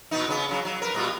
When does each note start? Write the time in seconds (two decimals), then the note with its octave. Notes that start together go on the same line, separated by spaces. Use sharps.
0.11 A#2 B3 D#4
0.27 C#3 B3
0.49 C#3 F#3
0.65 F#3
0.82 A#4 B4
0.94 A#2 G3 F4